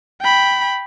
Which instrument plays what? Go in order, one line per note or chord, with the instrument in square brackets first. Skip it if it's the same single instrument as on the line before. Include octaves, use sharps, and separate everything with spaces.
[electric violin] G5 B5